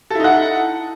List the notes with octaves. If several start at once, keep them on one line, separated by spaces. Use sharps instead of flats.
D#4 E4 A4 F#5